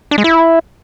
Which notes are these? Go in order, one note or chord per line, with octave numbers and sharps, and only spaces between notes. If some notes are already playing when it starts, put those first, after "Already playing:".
D4
G#3
E4